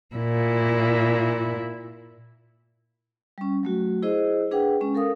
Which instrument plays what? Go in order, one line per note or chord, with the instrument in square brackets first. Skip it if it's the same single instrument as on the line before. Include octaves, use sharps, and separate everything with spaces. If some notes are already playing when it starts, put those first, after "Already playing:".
[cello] A#2 E4
[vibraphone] G3 C#4
F#3 A3 F#4
E4 G#4 C5 D#5
D4 G#4 B4 F#5 G5
G#3 C#4
A4 A#4 F5 D#6